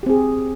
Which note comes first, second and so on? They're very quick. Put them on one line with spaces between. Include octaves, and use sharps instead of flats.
G4 C4 G#4